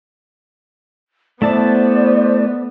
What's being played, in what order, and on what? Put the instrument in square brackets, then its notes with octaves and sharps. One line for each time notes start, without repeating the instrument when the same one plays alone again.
[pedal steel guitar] A3 E4 A5 [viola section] B3 [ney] C5 [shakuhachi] D5